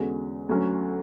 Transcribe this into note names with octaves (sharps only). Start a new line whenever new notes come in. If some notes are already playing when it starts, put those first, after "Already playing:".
Already playing: E2 D3 G#3 C#4 F#4
D2 D3 F#3 C#4